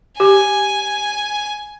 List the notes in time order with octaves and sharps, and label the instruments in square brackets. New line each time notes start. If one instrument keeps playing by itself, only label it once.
[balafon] G4 [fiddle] G#5